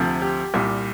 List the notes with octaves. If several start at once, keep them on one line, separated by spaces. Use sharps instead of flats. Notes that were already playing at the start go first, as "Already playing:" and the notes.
Already playing: D2 C3 F3
G4
C2 A#2 G3